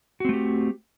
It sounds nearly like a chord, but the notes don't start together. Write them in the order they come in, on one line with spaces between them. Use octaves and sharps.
F#4 C4 A3 G4